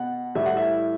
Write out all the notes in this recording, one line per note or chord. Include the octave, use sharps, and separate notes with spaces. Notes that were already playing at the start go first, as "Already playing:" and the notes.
Already playing: B2 F#5
A2 E3 G3 E5
F#5
E5